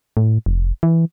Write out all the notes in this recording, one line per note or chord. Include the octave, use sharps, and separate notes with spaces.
A2
F1
E3